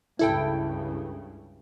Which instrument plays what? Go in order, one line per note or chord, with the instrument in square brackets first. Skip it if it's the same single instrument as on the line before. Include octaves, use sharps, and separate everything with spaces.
[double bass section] C#2 G2 C#3 [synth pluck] E4 A4 G5